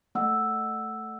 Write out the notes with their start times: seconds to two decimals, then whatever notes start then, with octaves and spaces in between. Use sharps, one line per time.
0.15 A3 F#5 E6